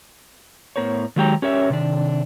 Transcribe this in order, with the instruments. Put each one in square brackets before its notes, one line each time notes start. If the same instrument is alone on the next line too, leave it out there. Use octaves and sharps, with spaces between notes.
[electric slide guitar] A2 B3 A#4 C5 C#5
D#3 F#3 G#3 G4 G5 A#5
C#4 G4 A#4 C#5 E5
C3 D#3 D4